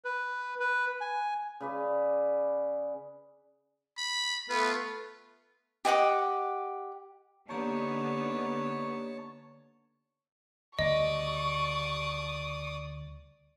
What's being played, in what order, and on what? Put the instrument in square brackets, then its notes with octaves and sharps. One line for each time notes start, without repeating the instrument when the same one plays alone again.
[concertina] B4
B4
G#5
[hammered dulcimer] C#3 B4 D5
[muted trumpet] B5
[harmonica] A3 B3 [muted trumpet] F4 [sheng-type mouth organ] B4
[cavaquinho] G4 D#5 F#5 D6
[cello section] D3 B3 D#4 [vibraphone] A#3 G4 A#5 [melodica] C#5 A5
[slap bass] D2 C#3 G3 [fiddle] D5 D#6 [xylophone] D#5 [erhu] C#6